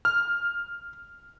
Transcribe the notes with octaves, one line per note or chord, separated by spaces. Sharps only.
F6